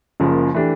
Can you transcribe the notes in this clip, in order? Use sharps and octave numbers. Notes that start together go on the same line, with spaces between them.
F#1 F#2 C#3 F3 A#3
E3 A3 D4 G4